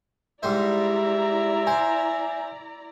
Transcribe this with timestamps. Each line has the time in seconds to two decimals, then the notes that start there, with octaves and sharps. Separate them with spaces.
0.43 G#2 G3 E4 C5 D5 E5 A#5
1.67 C5 G#5